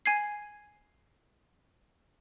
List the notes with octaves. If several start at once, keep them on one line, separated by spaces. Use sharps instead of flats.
G#5 G#6 C7